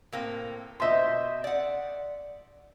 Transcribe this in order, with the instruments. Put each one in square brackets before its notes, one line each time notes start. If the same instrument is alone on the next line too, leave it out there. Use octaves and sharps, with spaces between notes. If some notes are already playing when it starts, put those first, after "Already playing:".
[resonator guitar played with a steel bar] A2 A#3 C4
[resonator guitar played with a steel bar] B2 C5 [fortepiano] D#5 E5 C6
[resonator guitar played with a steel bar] D5 F#5